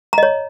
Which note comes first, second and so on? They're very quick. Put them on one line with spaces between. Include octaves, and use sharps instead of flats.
A#5 D#5 C#5